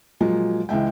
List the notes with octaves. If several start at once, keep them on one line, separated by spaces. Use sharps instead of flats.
A#2 F3 F#3 G#3
C#2 E3 G#3 E5 G5